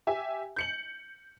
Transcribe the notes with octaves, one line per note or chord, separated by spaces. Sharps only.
G4 E5 G#5
G6 C#7 F#7